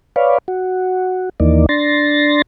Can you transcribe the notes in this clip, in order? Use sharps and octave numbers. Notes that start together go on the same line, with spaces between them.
B4 C#5 D5 F5
F#4
D#2 E3 A#3 D#4 D5
D4 C6 A6 A#6